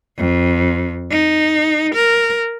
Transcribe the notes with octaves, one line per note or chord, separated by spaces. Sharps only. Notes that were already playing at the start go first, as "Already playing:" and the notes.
F2
D#4
A#4